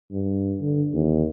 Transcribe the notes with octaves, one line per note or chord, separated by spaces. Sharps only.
G2
D3
D#2